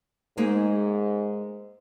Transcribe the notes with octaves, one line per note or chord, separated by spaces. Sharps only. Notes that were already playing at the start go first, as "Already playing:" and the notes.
G#2 G#3 A#3 D#4